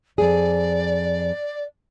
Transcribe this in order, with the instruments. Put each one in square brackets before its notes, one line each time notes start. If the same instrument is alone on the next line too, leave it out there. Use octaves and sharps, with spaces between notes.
[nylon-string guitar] F2 G#4 [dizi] D5